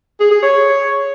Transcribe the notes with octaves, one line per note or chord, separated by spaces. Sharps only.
G#4
G#4
C#5